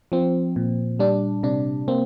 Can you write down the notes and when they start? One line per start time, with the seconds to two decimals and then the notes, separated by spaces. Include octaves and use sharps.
0.12 F3 C4
0.56 A#2
0.99 G3 D4
1.43 C3 D4
1.88 A#3 C4